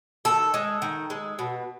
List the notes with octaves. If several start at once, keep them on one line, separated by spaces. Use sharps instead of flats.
D#3 A4
G#3
D#3
G#3
B2